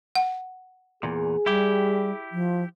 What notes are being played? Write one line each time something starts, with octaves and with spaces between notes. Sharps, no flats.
F#5
E2 A#2 G#4
G3 E4 G4
F3